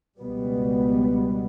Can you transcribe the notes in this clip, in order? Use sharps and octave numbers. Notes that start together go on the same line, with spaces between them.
C#2 B2 G3 B3